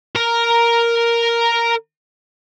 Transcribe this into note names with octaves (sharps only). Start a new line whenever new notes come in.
A#4 A#5